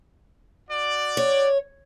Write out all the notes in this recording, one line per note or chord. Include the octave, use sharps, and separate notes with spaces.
F#4 D5
C#5